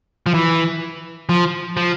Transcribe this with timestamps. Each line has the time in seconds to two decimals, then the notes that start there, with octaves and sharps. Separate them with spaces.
0.26 F3
0.34 E3
1.29 F3
1.77 F3